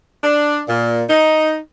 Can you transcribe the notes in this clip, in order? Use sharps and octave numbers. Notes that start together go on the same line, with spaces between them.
D4
A#2
D#4